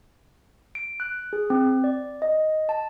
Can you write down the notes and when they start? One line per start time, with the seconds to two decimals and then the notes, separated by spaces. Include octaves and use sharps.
0.75 D7
1.00 F#6
1.33 G#4
1.50 C4
1.84 D5
2.22 D#5
2.69 A5